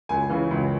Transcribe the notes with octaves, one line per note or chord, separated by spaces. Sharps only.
C#2 G#5
C#3 E3
C#2